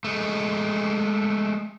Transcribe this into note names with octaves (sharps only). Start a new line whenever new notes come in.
G#3 A3